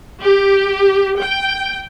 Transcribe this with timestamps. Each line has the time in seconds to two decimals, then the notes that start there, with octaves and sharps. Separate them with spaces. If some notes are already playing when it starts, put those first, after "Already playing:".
0.21 G4
1.18 G5